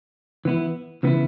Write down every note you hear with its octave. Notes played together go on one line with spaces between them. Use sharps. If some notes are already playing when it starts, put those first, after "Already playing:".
E3 B3 E4
C#3 E3 B3 E4